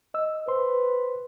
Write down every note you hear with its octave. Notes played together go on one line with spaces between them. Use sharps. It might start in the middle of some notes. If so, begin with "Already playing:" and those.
D#5 E6
B4 C5 C6